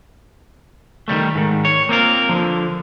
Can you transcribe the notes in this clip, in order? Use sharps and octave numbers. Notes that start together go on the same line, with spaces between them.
D#3 F3 G3 A3
G#2 D#3
C#5
A#3 C4 F4 A#4
D3 F3